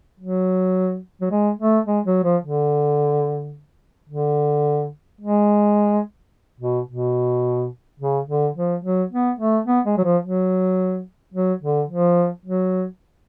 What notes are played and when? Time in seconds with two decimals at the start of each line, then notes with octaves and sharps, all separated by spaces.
0.20 F#3
1.21 F#3
1.31 G#3
1.60 A3
1.87 G#3
2.06 F#3
2.24 F3
2.43 D3
4.10 D3
5.21 G#3
6.60 B2
6.89 B2
8.00 C#3
8.28 D3
8.56 F3
8.84 F#3
9.11 B3
9.39 A3
9.67 B3
9.86 G#3
9.98 F#3
10.04 F3
10.23 F#3
11.34 F#3
11.63 D3
11.89 F3
12.46 F#3